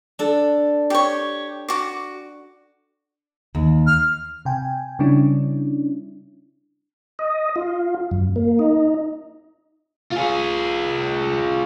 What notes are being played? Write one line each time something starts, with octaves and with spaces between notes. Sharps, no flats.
D4 A4
G4 C#5
F#4 D6
D#2
F6
C3 G5 G#5
C#3 G3 C#4 D4 E4
D#5
F4
F#2
A#3
D#4
F4 G#4